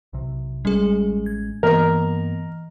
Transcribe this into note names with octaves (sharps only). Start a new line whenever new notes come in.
B1 C3
A1 G3 G#3 C#4 G#4
G#6
G2 E3 A#3 B3 A#4 D#5